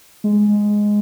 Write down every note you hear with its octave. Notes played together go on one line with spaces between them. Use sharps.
G#3